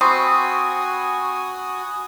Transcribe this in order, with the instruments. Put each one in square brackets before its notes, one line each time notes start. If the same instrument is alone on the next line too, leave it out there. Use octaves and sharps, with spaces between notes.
[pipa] C4 [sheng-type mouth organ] F#4 G#5 [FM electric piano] B5 C#6 D#6